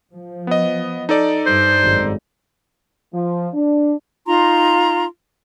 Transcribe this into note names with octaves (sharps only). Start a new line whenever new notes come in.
F3
B3 D#5
D#4 A4 D5
G2 C5
G#1 F#2
F3
D4
D#4 F4 A#5 C6